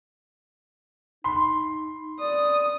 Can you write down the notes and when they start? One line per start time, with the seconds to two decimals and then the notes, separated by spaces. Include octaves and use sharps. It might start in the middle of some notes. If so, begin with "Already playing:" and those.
1.24 D#4 B5 C6
2.20 D5 D#6